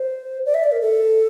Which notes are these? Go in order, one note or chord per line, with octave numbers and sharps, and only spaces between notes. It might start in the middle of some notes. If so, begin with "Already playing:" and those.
Already playing: C5
D5
E5
D5
A#4
A4